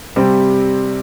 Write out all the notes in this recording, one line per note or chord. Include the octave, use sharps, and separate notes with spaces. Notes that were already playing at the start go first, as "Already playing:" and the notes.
C3 G3 C4